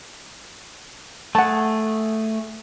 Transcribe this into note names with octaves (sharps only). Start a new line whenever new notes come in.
A3 G#4 F#5 A5